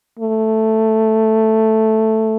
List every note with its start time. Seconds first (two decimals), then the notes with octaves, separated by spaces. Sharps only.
0.19 A3